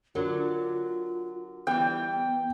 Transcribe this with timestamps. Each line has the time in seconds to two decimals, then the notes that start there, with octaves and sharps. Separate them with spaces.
0.15 D3 F#3 F4 A#4
1.67 E3 G3 B3 G5